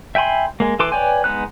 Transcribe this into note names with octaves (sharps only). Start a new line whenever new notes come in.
E5 G5 G#5 B5 C6
G#3 A#3
E3 A4 B4 C6 D6
B4 C#5 D5 G5 G#5
G#3 B3 D#4 F#6